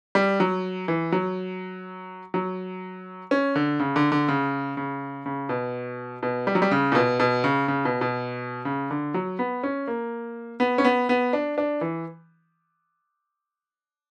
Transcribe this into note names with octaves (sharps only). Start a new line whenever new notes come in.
G3
F#3
E3
F#3
F#3
C#4
D3
C#3
D3
D3
C#3
C#3
C#3
B2
B2
G3
F#3
G3
C#3
A#2
B2
B2
C#3
C#3
B2
B2
C#3
D3
F#3
B3
C#4
A#3
B3
C#4
B3
B3
D4
D4
E3